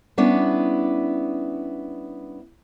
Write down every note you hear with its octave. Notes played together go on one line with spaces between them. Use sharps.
G3 B3 C#4 D4 E4